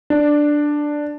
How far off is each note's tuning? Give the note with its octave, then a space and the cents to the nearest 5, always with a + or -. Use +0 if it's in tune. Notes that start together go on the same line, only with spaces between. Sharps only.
D4 +5